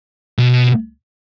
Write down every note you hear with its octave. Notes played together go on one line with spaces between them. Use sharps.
B2